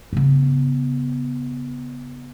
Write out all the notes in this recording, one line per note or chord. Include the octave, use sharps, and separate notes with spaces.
C#3 B3